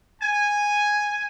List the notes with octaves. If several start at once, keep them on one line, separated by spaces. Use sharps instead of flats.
G#5